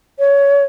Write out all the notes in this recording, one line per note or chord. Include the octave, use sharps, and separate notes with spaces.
C#5